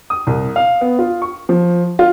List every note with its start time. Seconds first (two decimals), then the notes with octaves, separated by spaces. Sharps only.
0.10 D#6
0.27 C2
0.56 F5
0.81 B3
0.99 F4
1.22 C#6
1.49 F3
1.99 F4